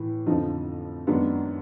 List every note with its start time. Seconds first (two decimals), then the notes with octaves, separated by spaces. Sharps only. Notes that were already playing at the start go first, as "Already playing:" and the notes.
Already playing: A2 E3
0.26 F2 D3 F3 D#4
1.07 F#2 D#3 G#3 B3 D4